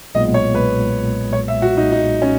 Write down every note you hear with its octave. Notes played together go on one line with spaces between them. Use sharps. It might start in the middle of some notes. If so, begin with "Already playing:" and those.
B1 A#2 G#3 B3 D#5
C#5
B4
C#5
E5
F#4
D#4
D#4
C#4